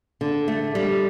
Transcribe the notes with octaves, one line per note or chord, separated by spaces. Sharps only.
D3
A3
G3